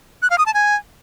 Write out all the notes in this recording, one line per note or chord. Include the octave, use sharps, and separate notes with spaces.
F#6
F5
D#6
A5
G#5